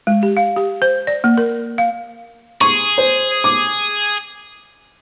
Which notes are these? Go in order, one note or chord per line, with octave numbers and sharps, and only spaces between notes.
G#3
G4
F5
G4
C5
D5
A#3
A#4
F5
G#4 C#6
C5
D6